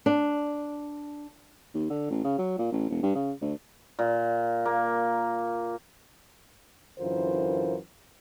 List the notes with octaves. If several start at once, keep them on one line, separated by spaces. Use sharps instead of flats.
D4
D#2
D3
A1
C#3
F#3
A#2
A1
E1
G2
C#3
D2
A#2
A#3
F#2 D3 E3 F4 A#4 C5